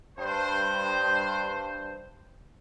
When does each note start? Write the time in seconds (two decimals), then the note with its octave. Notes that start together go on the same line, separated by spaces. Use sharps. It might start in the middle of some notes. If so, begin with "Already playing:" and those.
0.17 G2 C5